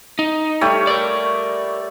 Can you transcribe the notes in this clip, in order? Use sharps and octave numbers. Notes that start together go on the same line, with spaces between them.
D#4
G3 A3 C#5
A#4 D5